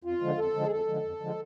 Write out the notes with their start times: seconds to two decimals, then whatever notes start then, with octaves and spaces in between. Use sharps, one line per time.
0.04 F2 F4
0.21 D3 F3 G#3
0.37 F2 A4
0.54 D3 F3 G#3
0.65 G#4
0.71 F2 A4
0.87 D3 F3 G#3
1.03 F2
1.20 D3 F3 G#3